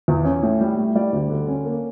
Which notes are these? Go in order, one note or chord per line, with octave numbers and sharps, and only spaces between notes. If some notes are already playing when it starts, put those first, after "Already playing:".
E2
C#4
A2
G3
A2
G3 D5
D2
D3
C#4
A#3